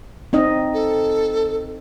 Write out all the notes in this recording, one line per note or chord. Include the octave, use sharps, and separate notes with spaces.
C4 D#4 D#5
A4